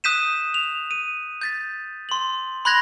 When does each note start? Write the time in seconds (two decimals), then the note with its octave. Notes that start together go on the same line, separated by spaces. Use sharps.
0.04 D#6 F#6 G6 B6 D#7 E7
0.54 F7
0.91 D#7
1.41 G6 A6 B6
2.09 C6 F#7
2.65 B5 C6 F#6 G#6 A#6 F7